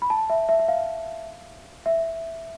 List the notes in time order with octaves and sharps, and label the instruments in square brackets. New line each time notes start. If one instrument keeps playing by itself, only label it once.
[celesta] B5
A5
E5
E5
E5
F5
E5